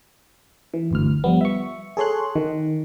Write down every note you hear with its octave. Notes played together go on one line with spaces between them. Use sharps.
E3
G1 D2 F6
F3 G3 B3
E5 C#6
G#4 A4 C#5 C6 F#6
D#3